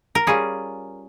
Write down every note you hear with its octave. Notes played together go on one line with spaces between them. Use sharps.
A#4
G3 C#4 F4 G#4